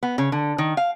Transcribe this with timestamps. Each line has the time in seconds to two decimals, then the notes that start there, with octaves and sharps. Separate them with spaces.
0.03 B3
0.18 C#3
0.32 D3
0.58 D#3
0.77 F5